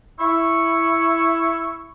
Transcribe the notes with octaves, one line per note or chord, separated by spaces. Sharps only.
E4 C#6